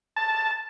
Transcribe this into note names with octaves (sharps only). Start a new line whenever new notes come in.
A5